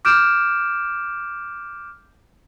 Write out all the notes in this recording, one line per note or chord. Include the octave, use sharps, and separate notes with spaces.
D6 F6 G6 D7 E7